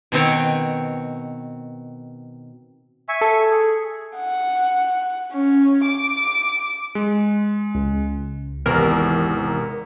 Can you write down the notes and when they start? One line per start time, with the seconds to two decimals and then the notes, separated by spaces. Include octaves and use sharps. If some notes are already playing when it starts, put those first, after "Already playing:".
0.12 B2 D#3 C4 C#5
3.09 E5 G#5 C#6
3.21 A4
3.51 G#4
4.18 F#5
5.32 C#4
5.86 D6
6.95 G#3
7.75 C#2
8.66 G#1 E2 C3 E3 A#4